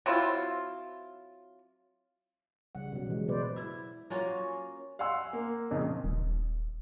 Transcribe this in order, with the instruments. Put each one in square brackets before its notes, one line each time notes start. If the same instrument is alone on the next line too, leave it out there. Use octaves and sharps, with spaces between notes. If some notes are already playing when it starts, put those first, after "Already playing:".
[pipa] F#3 C4 E4 F4
[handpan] C#3 G3 F#5
B2 F#3
E3 G#3
B2 B4 C5 D5
[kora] E4 E5
A#3 C#4 F4 F#4
[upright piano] F5 F#5 G#5 C6 E6
A#3
F2 A#2 C#3 D#4
[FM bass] D#1